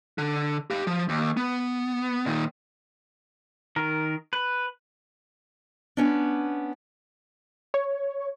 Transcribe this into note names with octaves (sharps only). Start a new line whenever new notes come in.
D3
G4 F5
F3
D#2
B3
A#2 D#3
D#3 A#4
B4
B3 C#4 D4
C#5